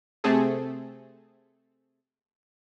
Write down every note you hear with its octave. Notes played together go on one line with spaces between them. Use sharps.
C3 A3 C4 G#4 A4